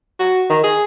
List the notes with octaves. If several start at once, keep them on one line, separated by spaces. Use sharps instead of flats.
F#4
D#3
G#4